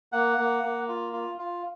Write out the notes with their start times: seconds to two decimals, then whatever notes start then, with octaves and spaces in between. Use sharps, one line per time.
0.12 A#3 F#5
0.37 A#3
0.63 A#3
0.88 F4
1.13 F4
1.38 F4